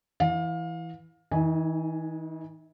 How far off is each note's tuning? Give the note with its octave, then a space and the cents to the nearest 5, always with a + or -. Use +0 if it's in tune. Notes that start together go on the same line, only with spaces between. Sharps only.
E3 +0 F5 +25
E3 -40 D#4 +0 G#5 +0